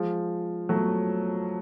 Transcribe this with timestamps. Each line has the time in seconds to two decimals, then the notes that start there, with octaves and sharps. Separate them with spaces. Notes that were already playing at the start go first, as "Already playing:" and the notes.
Already playing: F3 G#3
0.69 F#3 A3